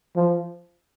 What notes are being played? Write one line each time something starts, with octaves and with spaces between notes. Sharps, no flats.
F3